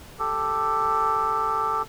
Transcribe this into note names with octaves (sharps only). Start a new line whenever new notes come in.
G4 A4